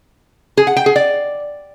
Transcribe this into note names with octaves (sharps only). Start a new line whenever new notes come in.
G#4
F#5
G5
G#4
D5